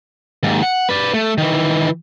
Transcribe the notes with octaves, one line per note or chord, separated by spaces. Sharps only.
D#2 G#2
F#5
B4 D5
A3
D#3 E3